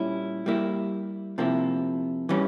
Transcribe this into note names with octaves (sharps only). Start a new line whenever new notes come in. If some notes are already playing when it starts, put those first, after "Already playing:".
Already playing: A#2 G3 C#4 E4
G3 A#3 E4
C3 F3 A#3 E4
E3 G3 C#4